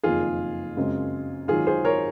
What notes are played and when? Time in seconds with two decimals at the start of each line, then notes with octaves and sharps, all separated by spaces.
0.03 F#1 F2 D#3 F4 G#4
0.77 F#2 C#3 G#3 C4
1.48 G#1 G#2 D#3 F#3 F4 G#4
1.67 G#4 C5
1.85 A#4 C#5